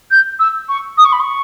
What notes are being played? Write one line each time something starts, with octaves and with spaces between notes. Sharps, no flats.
G6
E6
C#6
D#6
C#6
B5
C#6